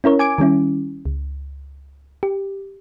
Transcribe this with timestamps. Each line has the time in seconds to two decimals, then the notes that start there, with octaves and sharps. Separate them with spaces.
0.04 C#4 E4 A#4 C#5
0.19 G#5 D6 G#6 D7
0.38 D#3 G3 C#4 E4
1.05 C#2
2.23 G4